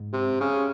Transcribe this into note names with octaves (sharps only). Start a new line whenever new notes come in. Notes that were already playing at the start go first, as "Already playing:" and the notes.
Already playing: G#2
C3
C#3